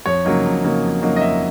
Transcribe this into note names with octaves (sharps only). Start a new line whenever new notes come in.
F2 C#5
C#3 F#3 A#3 D#4
F2
C#3 F#3 A#3 D#4
F2
C#3 F#3 A#3 D#4
D#5
F2 E5